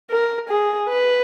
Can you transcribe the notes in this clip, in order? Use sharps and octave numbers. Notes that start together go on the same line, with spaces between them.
A#4
G#4
B4